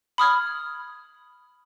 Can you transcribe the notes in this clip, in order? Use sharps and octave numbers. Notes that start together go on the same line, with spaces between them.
B5 D#6 F6 G#6